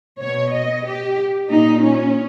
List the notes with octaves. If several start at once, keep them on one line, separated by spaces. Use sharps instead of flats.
B2 C#5
D#5
G4
A#2 D#4
C#4